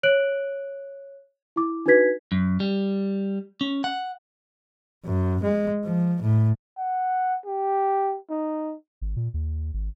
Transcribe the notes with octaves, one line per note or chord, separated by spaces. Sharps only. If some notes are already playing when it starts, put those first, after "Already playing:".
C#5 F#6 D7 F#7
E4 D6
D4 D#4 F#4 B4 G#6 B6
F#2
G3
C#4
F#5
F#2
G#3
F3
A2
F#5
G4
D#4
G#1
A#2
D#2
G#1